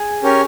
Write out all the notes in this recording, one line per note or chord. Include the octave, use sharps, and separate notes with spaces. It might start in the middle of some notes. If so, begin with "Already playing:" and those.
Already playing: G#4
C#4 G4 A#4 C#5